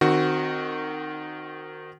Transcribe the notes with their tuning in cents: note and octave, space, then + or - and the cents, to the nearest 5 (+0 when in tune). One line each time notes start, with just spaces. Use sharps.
D#3 -20 C4 +0 F#4 +0